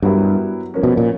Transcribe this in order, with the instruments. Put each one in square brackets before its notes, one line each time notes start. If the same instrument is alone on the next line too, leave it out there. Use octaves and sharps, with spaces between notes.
[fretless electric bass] G2 [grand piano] F#3 B3 E4 G4 A#4
[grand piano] F3 A#3 C#4
[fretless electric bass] B2
A#2